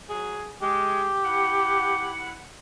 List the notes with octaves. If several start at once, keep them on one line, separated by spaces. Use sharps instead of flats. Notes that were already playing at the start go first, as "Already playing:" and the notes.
F#3 G#4
G#3 G4
E4 F#5